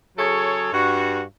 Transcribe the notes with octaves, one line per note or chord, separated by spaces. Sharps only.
C#3 F#3 G#4 A4 C#5
G2 F#4